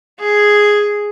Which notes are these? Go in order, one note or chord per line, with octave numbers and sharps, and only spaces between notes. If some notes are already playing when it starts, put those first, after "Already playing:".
G#4